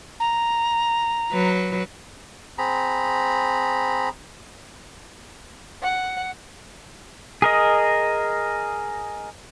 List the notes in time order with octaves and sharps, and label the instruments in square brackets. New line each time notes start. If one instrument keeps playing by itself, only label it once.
[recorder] A#5
[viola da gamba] F#3 B4
[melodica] C4 G#4 A#5 B5
[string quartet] F#5
[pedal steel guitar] G#4 A#4 D#5